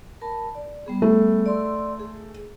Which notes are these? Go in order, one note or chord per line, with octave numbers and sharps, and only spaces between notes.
A#4 A5 B5
D5
G3 B3 G#4
A3
D5 C6 E6
G#4